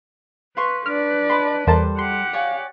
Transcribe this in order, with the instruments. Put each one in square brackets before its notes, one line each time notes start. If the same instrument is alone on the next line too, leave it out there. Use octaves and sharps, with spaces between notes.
[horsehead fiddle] B4 [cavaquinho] F5 C6 C#6
[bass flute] D4 [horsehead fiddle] B4 D5 [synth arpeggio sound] F6
[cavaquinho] D#5 A5 B5 [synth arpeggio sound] C6
[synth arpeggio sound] E2 A#4 A5 [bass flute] G3 [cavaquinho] A4 C5
[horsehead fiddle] G4 F#5 [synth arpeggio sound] C6
[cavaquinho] C#5 D5 G#5 [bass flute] F5